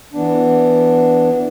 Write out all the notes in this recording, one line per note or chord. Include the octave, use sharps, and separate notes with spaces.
E3 B3 D4